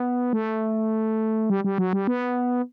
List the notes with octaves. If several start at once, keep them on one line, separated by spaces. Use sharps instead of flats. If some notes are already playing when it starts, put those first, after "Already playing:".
Already playing: B3
A3
G3
G3
F#3
G3
B3